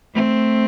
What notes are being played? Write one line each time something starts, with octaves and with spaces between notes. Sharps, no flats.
A3 C4